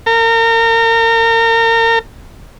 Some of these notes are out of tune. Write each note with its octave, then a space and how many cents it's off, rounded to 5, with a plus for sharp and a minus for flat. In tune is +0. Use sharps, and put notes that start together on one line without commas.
A#4 -30